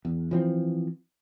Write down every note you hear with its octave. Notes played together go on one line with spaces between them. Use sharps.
E2
E3 F3 C4